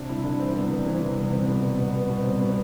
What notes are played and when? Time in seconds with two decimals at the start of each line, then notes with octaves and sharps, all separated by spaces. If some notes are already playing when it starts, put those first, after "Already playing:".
Already playing: C3 D4
0.09 C2 E4
0.24 C2 D4
0.39 E3 C4
0.55 C2 B3
0.70 C2
0.86 E3 C4
1.01 C3
1.17 C2 B3
1.32 C2 C4
1.48 B2 B3
1.63 C2
1.79 B2 B3
1.94 C2
1.99 B3
2.10 B2
2.20 C4
2.25 C2
2.40 B2 B3